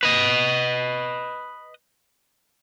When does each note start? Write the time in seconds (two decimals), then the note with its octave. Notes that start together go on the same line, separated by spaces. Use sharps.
0.03 B4 D#5